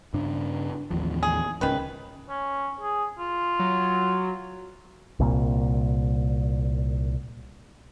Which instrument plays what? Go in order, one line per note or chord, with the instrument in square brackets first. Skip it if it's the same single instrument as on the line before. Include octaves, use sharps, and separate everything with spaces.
[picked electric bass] G2 C#3 D4
A1 D#2 F3
[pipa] G#4
[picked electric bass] D1 C#2 C#4 [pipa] D#3 B4
[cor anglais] C#4
G#4
F4
[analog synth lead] F#3
[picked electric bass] C2 A#2